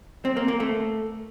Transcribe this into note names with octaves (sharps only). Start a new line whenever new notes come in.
C4
A#3
A#3
A3